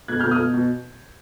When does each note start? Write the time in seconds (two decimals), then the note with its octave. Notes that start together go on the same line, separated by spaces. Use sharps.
0.08 B2 F#6 G#6
0.20 F6 G6
0.24 B2
0.31 D#6 F6
0.39 B2
0.54 B2